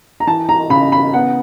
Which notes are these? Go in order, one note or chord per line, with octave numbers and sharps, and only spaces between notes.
A#5
E3 A5
A#5
C#3 B5
B5
B3 F#5